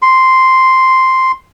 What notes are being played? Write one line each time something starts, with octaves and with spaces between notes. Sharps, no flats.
C6